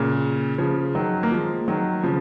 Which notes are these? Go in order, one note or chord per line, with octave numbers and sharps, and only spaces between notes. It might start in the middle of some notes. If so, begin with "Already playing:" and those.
Already playing: A#2 C#3
C#3 F3
D#3 F#3
A#3
F3 G#3
D#3 F#3
C#3 F3